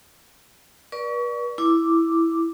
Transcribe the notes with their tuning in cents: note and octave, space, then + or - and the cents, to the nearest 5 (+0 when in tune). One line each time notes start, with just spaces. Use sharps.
B4 -40 D5 +0 C#6 +30
E4 +0 D6 +0